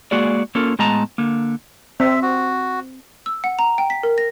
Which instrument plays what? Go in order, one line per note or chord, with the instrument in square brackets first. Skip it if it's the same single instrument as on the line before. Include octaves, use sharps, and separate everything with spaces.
[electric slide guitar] G#3 A#3 F#4 G#4 D5
A#3 C#4 F4 A4 A#4
A2 G#3 B3 D#5 A5 A#5
D3 A#3
[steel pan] C4 [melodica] E5
[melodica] F#4
[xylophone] E6
F#5
A#5
G5
B6
A#4
A#6